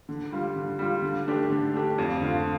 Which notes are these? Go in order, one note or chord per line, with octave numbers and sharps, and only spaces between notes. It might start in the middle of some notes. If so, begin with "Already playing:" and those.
D3
G3 F4
D3
G3 F4
D3
A3 D4 G4
D3
A3 D4 G4
F2
D3 A3 F4